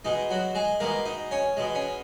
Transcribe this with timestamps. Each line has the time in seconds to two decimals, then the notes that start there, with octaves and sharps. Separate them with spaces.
0.05 B2 G#3 D#4
0.30 F#3 F#4
0.55 G#3 G#4
0.80 B2 G#3 A#3 A#4
1.05 D#4 D#5
1.31 C#4 C#5
1.57 B2 G#3
1.75 C#4